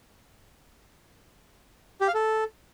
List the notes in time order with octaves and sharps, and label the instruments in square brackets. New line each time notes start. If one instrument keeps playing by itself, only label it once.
[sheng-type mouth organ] G4
F5
A4